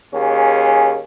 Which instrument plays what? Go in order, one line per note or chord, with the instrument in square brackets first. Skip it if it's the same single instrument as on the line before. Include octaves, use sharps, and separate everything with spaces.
[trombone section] D#2 C#4 G#4